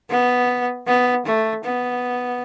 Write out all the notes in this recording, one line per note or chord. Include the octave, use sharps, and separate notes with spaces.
B3
B3
A3
B3